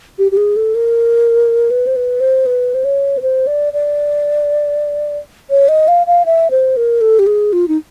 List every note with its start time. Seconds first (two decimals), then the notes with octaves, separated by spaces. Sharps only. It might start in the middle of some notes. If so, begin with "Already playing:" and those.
0.19 G4
0.32 G4
0.37 G#4
0.56 A4
0.75 A#4
1.71 B4
1.87 C5
1.96 B4
2.20 C5
2.46 B4
2.74 C5
2.84 C#5
3.18 B4
3.22 C5
3.47 D5
3.73 D5
5.50 C#5
5.68 D#5
5.88 F5
6.07 F5
6.26 E5
6.51 C5
6.77 A#4
7.01 A4
7.19 G4
7.27 G#4
7.53 F4
7.68 D#4